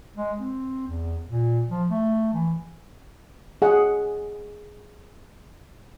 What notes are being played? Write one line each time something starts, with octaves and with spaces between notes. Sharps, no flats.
G#3
C4
E2
A#2
F3
A3
E3
G#4 F#5